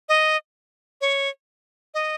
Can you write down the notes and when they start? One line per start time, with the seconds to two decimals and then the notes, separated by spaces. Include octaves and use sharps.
0.09 D#5
1.01 C#5
1.94 D#5